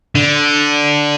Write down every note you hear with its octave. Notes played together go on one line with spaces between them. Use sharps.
D3